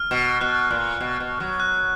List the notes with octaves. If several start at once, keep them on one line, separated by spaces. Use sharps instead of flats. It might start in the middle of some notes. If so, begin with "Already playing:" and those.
Already playing: F6
B2
B2 F#6
A#2
B2
B2
F#3
F#6